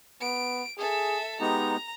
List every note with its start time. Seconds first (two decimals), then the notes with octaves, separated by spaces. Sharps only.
0.21 B3 D7
0.78 G#4 A4 E5
1.40 G#3 B3 D#4 G4 A#5